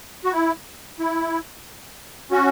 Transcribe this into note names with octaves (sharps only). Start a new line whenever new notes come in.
F#4
E4
E4
C#4 F#4